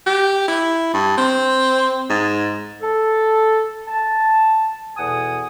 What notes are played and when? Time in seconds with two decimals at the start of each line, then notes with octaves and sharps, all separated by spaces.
0.06 G4
0.48 E4
0.93 G2
1.17 C4
2.10 G#2
2.81 A4
3.87 A5
4.97 E2 B2 A4 F#5 G#5 D#6